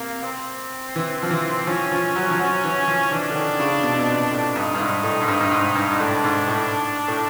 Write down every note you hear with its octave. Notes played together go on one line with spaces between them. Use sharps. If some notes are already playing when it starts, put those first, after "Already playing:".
Already playing: C3 A#3
C4
E3
F3
E3
F3 C#4
F3
F#3
F3
F#3
E3
F3
E3 D4
D3
D#3
C#3
B2
C3
B2
A#2
A2
G2 D#4
G2
G#2
A2
G#2
G2
G2
G#2
G2
G#2
A2 D4
G#2
A2
A2